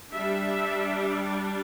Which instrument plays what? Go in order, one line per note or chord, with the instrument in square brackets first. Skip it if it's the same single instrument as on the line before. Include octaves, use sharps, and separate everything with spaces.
[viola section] G3 D4 E5